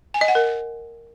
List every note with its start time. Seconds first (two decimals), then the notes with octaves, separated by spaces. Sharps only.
0.14 G#5
0.21 D#5
0.28 F#5
0.35 A#4